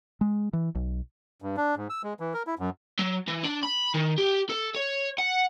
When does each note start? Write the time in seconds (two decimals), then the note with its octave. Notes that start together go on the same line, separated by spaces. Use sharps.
0.21 G#3
0.53 E3
0.75 B1
1.42 G2
1.57 D4
1.77 G#2
1.90 E6
2.03 G#3
2.20 E3
2.34 A#4
2.47 E4
2.59 F#2
2.99 F#3
3.28 E3
3.44 D4
3.63 B5
3.95 D#3
4.18 G4
4.50 A4
4.75 C#5
5.19 F#5